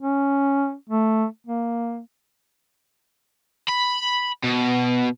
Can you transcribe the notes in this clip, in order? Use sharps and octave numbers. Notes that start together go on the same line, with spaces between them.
C#4
A3
A#3
B5
B2